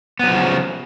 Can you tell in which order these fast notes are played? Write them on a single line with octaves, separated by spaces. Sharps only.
B3 F#3 F3 C#3